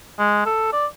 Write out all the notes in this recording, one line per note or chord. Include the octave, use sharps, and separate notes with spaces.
G#3
A4
D5